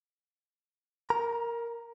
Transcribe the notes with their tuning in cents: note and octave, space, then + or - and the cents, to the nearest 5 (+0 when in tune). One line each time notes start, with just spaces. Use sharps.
A#4 +0 A#5 +30